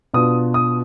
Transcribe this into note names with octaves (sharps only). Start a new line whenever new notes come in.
B2 B3 D4 F4 D#6
D#6